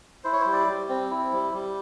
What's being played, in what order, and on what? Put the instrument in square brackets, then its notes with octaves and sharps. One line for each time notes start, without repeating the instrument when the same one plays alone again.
[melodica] E4 C5
C#5
G3 C5
D5
G3
C4
E4
G3
G3